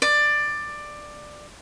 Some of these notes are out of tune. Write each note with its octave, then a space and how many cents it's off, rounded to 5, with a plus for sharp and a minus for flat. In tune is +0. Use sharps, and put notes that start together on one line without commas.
D5 +15